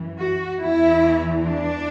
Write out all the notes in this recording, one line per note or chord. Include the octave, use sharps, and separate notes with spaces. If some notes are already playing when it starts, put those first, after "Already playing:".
Already playing: F#2 E3
F#4
E2 E3 E4
D4